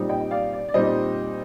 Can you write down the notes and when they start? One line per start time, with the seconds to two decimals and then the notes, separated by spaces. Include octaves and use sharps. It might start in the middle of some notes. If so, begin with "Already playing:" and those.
Already playing: A#2 G3 C4 D#4
0.09 D#5 G5
0.31 D5 F5
0.53 D5
0.69 D5
0.74 A#2 G3 C4 D#4 C5 D#5